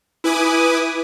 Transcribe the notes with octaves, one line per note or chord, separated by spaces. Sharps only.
E4 B4 G#5 D6 D#6